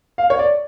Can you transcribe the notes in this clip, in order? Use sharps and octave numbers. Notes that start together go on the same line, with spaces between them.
F5
C#5
D5